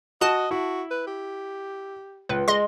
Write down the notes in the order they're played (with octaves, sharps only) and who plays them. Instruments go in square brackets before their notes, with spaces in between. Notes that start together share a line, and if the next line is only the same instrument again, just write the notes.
[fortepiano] F#4 [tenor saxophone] D#5 [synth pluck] A5
[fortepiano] E4 [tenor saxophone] F#4
[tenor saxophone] B4
G4
[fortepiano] C#2 [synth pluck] B4
[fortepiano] G#3 [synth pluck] D#5 C6